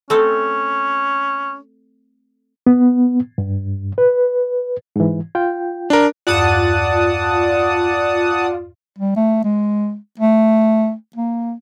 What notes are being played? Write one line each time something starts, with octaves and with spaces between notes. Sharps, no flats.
A3 C4 C#4 A4
B3
G2
B4
G#2 E3
F4 G5
D4 A#4
E2 G2 F4 D5 F#5 A5 D#6 F#6
G3
A3
G#3
A3
A#3